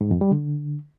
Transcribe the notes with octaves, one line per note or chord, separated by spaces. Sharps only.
G#2
F2
G3
D3